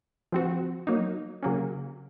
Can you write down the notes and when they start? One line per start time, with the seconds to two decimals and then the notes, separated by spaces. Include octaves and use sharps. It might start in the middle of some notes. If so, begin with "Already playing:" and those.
0.32 F3 C4 F#4
0.87 F#3 A#3 D#4
1.43 C#3 F#3 A#3 C#4